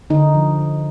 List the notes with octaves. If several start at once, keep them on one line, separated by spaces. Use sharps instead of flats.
D3 D#4
F3